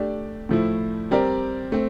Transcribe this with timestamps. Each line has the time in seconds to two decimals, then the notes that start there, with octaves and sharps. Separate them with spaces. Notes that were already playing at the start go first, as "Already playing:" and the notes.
Already playing: A3 D4 G4 D5
0.49 A2 F3 A3 E4
1.11 G3 C4 G4 A#4 D5
1.72 A3 C4